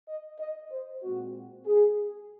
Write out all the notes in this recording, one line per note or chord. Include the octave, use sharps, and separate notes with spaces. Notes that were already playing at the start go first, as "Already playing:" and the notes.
D#5
D#5
C5
A#2 G#3 C4 F#4
G#4